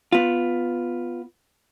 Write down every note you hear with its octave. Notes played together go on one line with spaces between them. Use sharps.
B3 F4